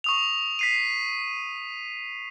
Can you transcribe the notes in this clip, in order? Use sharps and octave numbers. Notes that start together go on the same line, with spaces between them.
C#6 D#6 F7
B6 C7 D#7